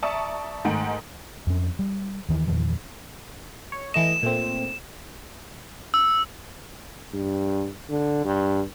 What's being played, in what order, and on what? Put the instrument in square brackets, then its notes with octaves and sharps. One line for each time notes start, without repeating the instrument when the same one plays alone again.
[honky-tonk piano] D5 E5 A5 A#5 C#6 D#6
G#2 D#3 A3 D#5 F#5 D7
[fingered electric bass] F2 C#4
G3
D#2 D#3 E3
E2 A#2 D#3 F3
[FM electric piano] C#5
[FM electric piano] E3 A3 D#5 [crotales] E7
[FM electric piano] A#2 A3 C4
[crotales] E6
[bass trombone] G2
D3
G2